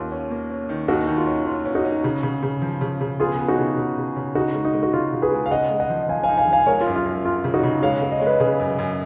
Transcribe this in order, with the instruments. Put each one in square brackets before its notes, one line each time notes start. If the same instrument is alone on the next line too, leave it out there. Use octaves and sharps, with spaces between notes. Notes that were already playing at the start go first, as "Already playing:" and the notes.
Already playing: [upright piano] D#2 C#4 [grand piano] F4
[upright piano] C#4
A#3
C#4
D#3
[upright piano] D#2 [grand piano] D#4 F#4
[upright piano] D#3
[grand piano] F4
[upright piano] C#4
[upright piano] C#4 [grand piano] F4
[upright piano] C#4
[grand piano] D#4 F#4
[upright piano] C#4
C#3
C#3
C#3
F3
C#3
C#3
[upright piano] B3 [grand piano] F4 G#4
[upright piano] B3
[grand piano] D#4 F#4
[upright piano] C#3
C#3
C#3
C#3
[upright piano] C#3 [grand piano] D#4 F#4
[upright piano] G#3
[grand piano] D#4
[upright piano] G#3
[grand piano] F#4
[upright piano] C#3 [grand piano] F4
[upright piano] C#3
[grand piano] G#4 B4
[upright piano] G#3
[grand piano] F5
[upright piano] C#3 [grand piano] D#5 F#5
[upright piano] G#3
[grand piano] D#5 F#5
[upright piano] F3
[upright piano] F3 [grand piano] F5 G#5
[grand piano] F5 G#5
[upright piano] D#4
[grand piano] F5 G#5
[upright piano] F3
[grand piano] F5 G#5
[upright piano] G#3 [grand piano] A#4 C#5
[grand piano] F4
[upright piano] F#2
[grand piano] F4
[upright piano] F#2
[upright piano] F#2 [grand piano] F4
[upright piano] C#3
[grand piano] D#4 F#4
[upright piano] C#3
[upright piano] G#3 [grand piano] C#5 F5
[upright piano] G#3
[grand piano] D#5
[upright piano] G#3 [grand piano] C#5
[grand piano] B4 D#5
[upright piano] C#3 [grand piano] G#4 B4
[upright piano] F#2
F#2